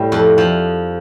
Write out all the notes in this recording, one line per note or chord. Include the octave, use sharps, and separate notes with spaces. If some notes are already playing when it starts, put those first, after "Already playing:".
Already playing: A2 G3
F2
F3